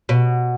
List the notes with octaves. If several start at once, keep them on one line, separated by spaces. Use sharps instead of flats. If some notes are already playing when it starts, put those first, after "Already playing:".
B2